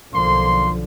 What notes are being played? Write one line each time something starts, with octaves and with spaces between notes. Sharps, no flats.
B1 D3 F3 A#3 C6